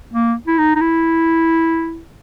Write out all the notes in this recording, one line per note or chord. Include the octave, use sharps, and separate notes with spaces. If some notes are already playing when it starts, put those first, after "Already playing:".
A#3
E4
D#4
D#4
E4